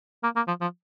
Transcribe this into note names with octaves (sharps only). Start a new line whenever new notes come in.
A#3
A#3
F3
F3